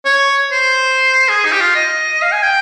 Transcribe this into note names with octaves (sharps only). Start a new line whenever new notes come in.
C#5
C5
G#4
D#4
G4
F4
D#5
F5
G#5
G5